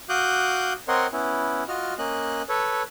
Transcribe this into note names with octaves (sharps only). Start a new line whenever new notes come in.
F#4 F5 D6 D#6 F#6 G6
C4 A#4 C#5 D#5 F#5 C6
B3 C#4 E4
F4 F#4 D#5 F6
A#3 C#4 D#5 F#6
A4 B4 C#5